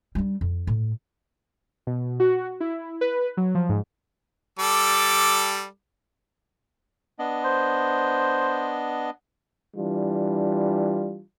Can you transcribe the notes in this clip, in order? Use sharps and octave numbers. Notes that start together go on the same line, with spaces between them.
G3 D4
F2
A2
B2
F#4
E4
B4
F#3
F3
G#2
G3 A4 D6
B3 D4 D#5
C5
E3 G3 D4 F4